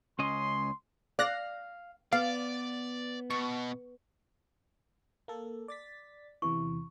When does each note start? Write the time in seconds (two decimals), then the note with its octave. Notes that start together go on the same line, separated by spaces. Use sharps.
0.19 C#2 C#4 D#5 C6
1.19 D5 F5 F#6 A#6
2.13 B3 D5 F5
3.30 B2 C#6
5.28 A#3 A4
5.68 D5 A6 B6
6.42 E2 C3 E3 C#6